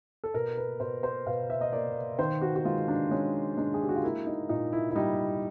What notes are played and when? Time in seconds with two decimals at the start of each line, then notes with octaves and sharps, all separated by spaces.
0.24 A4
0.34 B2 A#4
0.57 B4
0.80 B2 C5
1.03 C5
1.26 B2 F5
1.50 E5
1.61 D#5
1.73 A#3 D5
2.19 D#3 C5
2.42 F#4
2.56 F#4
2.65 G#3 F4
2.88 D4
3.11 G#3 C#4
3.57 G#3 D4
3.74 G#4
3.81 G4
3.89 F#4
3.96 F4
4.03 A#3 E4
4.26 D#4
4.49 A#2 D#4
4.73 E4
4.91 E4
4.96 G3 D#4